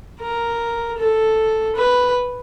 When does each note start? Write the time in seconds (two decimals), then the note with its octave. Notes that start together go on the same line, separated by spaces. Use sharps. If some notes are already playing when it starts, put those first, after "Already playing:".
0.20 A#4
0.98 A4
1.76 B4